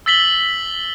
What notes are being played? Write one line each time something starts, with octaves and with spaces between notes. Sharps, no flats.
E6 A6 B6 F#7 G7